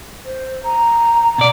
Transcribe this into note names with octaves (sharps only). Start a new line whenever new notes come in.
C5
A#5
B2 D5